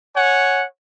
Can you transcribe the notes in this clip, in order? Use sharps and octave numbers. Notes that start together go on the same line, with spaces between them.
C#5 F#5 G#5